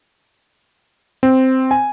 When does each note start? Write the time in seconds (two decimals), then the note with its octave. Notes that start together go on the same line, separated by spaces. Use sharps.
1.23 C4
1.71 G#5